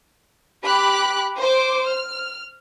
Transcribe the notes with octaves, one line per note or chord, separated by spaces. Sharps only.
G4 B5 D6 F#6
C5 D6
F6